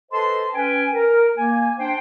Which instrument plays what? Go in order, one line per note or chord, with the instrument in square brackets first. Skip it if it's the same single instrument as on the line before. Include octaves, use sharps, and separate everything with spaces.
[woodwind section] A4 B4 C5 D#5 A5 C6
C#4 B4 G5 G#5
A#4
A#3 G#5
D4 C5 G5